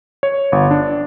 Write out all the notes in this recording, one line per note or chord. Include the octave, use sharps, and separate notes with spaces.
C#5
G1
D4